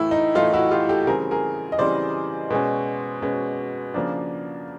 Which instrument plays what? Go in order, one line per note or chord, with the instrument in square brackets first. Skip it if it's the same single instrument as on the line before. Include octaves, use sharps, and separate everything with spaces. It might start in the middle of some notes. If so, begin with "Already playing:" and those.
Already playing: [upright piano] A2 E3 A3 E4
D#4
A2 E3 A3 D#4 F4
E4 F#4
F4 G4
G4 A4
C#3 E3 G3 C4 G#4 A#4
G#4 A#4
D#5
C#3 E3 G3 C4 C5 D5
B2 G#3 C#4
B2 G#3 C#4
C#3 F3 A#3 D4